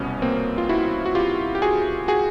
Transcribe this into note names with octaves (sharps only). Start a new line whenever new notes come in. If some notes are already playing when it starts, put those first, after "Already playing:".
Already playing: C2 B2 B3 C#4
A#3 C4
F4
E4 F#4
F#4
F4 G4
G4
F#4 G#4
F#4 G#4